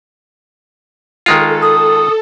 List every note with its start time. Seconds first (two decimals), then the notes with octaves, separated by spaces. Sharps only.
1.26 D#3 G#3 F4 A4
1.62 D#6